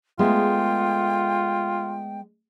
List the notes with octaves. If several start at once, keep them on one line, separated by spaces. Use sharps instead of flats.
G#3 A3 B3 F4 G5